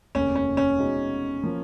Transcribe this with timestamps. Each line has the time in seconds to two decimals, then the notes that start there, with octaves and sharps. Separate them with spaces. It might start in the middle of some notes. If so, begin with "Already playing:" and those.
0.15 F1 D#2 C#3 C#4
0.35 C#4
0.57 C#4
0.78 B2 G#3 D#4 F#4
1.43 F3 A#3 C#4